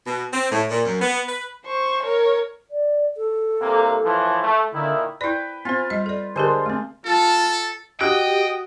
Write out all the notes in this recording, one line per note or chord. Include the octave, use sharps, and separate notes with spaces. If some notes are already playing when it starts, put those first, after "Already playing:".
B2
C4
A2
A#2
F#2
B3
B4
C5 C#6
A#4 C#5
D5
A4
C2 C3 A#3
A2 E3 F3
A3
A#2 D3 D#3 E4
E4 B4 D5 G5
B3 C4 F4 C5
G3 D#5
A4 D5
D3 G#3 D4 G4 A#4 C5
A3 C4
F4 A4 A5
F#4 G4 D#5 G5 D#6 F#6